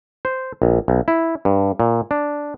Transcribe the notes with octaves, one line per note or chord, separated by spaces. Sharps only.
C5
A#1
B1
E4
G2
A#2
D4